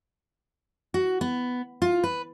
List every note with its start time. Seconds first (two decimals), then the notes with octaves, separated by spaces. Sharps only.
0.94 F#4
1.21 B3
1.82 F4
2.04 B4